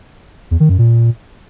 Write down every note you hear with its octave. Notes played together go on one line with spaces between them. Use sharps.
E2
D#3
F#2
A#2